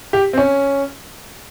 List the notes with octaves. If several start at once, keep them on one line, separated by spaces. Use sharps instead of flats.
G4
C4
C#4